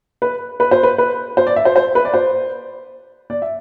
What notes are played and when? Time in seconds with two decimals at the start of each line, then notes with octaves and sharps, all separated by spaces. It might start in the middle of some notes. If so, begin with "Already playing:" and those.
0.22 B4
0.60 B4
0.71 C5
0.83 B4
0.98 B4
1.37 C5
1.47 D5
1.56 E5
1.65 C5
1.76 C5
1.95 B4
2.05 D5
2.14 C5
3.30 D5
3.42 E5